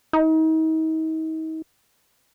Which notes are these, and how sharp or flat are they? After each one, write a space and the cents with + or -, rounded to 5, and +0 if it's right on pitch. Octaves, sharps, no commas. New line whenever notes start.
D#4 +40